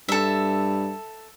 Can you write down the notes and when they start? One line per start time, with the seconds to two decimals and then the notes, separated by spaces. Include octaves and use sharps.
0.08 G2 A4 E5